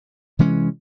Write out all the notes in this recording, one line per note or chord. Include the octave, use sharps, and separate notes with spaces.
C3 E3 G#3 C#4